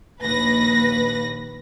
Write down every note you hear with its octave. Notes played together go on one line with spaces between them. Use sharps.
A#1 D#2 B4 A#6